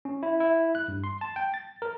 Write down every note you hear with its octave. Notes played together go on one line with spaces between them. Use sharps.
C#4
E4
E4
F#6
G2
C6
A5
G5
A6
A#4